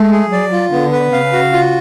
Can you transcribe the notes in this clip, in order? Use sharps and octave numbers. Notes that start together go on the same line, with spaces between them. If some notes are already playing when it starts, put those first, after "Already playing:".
Already playing: G#3 A3
G#4
F#3 D5
F4
D3 B3
B4
C#3 F5
F#4
F4